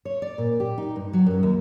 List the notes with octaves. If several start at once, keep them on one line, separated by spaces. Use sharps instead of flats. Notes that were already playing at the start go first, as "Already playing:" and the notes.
C#5
D5
A#2
G4
D#4
G2
F#3
F#2
D#2